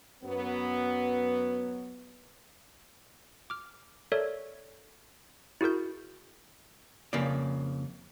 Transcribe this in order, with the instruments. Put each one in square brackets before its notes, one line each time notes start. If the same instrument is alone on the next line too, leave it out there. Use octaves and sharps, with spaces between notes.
[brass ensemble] F#2 F#3 B3
[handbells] D6 F6
A4 A#4 C#5 D5 E5
E4 F#4 G#4 A#4 G6
[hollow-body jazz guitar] F2 C#3 A#3 B4 D5